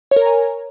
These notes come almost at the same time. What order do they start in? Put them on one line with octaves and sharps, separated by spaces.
C#5 A#4 A#5 G#5